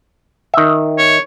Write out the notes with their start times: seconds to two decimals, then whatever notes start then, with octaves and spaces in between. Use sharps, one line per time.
0.54 D#3 E5
0.98 C#5